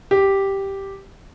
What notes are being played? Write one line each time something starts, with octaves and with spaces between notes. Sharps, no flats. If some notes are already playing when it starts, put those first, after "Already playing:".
G4